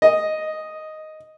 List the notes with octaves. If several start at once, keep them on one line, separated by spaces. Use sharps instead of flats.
D#5